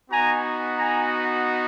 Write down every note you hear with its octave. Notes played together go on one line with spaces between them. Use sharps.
B3 D#4 F#4 G#5 A#5
G#5 A#5